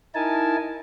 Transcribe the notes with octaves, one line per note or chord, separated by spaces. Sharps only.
D#4 E4 A#4 G#5 A5